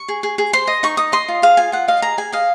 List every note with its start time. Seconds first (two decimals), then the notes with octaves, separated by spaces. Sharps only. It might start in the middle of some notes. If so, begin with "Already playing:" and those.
Already playing: C#6
0.08 G#4
0.23 G#4
0.38 G#4
0.53 C5 C6
0.67 D#5
0.83 D#4 C#6
0.97 D#4 D#6
1.12 D#5 C6
1.28 F4
1.42 G#4 F5
1.57 F4 G#5
1.72 F4 F#5
1.88 D#5 F5
2.02 G#4 A#5
2.18 G#4 G#5
2.33 D#5 F5